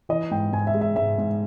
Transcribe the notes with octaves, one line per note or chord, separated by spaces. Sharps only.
E3 D#5
G#2 G5
G#2 G#5
E5
G#3
E5
G#2 E5
G#2